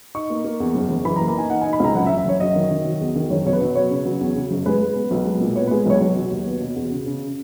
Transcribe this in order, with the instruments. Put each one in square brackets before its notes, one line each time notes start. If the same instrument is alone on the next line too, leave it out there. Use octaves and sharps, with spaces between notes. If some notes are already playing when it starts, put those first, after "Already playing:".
[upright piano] D#4 C#6
A#3
A#3
E2
F#1
F#1
E3 B5
A#5
A#3
A#5
D#4 G#5
D#4 F#5
G#5
D#4
B5
C#2 A#5
F#1 F#5
E5
F#1
E5
F#1 C#5
F#3 D#5
D#3
D#3
F#3
E2
D#3
F#1 C#5
B2 C#5
B4
F#3
B3 C#5
C#3
F#3
E2
C#3
F#1
G#3 B4
G#3
B3
B1
G#3
A#2
B3 C#5
B4
G#3
B1 C#5
F#3 C#5
F#3
D#2
B3
B2
E2
C#3
C#3